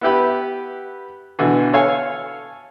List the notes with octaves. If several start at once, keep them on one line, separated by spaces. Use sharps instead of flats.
B3 E4 G4 B4
B2 D3 E3
A4 C#5 F5 G#5